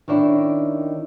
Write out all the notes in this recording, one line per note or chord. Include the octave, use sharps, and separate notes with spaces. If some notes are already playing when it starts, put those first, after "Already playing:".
D#3 C#4 D4 E4